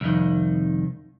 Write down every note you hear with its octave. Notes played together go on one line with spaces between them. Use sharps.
C2 F2 D#3